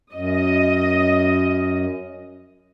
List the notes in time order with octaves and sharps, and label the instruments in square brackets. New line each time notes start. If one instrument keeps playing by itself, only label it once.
[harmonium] F#2 [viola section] D#5